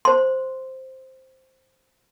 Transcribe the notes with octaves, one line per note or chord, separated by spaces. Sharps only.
C5 C6